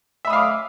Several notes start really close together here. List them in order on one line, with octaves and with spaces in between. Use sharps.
E5 B5 D#6 F5 D6